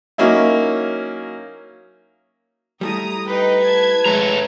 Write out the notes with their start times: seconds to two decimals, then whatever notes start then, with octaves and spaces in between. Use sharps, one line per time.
0.18 F#3 A#3 C#4 D#4 E4
2.81 G3 A3 E4 A#5 D#6
3.27 D#4 B4 G5
3.61 A5 G#6
4.06 G#3 A3 C#5 A#5